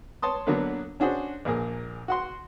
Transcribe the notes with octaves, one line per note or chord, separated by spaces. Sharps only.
C#5 A5 C6 D#6
D3 F#3 A#3 B3 D4 B4
C#4 D4 F#4 G#4 C5
A#1 A#2 G#4 A#4
F#4 F#5 C6